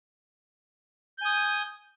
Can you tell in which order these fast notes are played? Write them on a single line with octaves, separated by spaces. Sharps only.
G6 G#5 D#6